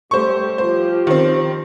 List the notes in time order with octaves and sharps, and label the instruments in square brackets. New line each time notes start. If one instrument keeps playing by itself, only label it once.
[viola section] G3 A3 G4 [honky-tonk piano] C5 C#6
[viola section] F3 F4 G4 [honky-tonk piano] C5
[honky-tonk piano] D#3 C4